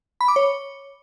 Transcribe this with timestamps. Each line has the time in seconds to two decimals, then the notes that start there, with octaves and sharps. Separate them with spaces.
0.21 B5
0.28 D6
0.36 C#5